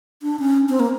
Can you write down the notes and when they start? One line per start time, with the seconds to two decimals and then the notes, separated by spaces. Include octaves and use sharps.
0.23 D4
0.39 C#4
0.69 C4
0.80 A#3